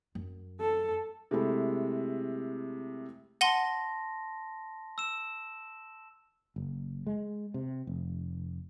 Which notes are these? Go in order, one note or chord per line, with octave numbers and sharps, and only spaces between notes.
F#2
A4
C3 G#3 A3 E4 A4
F#5 A5 C6 A#6 D#7 G7
E6 E7
F#1
G#3
C3
F1